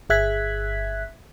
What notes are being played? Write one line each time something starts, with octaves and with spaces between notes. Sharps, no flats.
G1 G#4 E5 F#6 G#6 B6